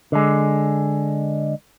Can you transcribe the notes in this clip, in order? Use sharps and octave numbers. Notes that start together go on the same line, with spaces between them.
D3 G#3